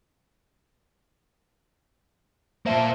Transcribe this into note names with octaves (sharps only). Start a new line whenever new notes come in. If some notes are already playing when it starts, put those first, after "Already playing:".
A#3 F4 C5 E5 A5